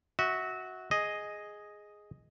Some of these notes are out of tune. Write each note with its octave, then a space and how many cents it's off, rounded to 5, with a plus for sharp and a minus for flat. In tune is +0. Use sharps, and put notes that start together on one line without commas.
F#4 +0 E5 -30
G#4 +0 D#5 +0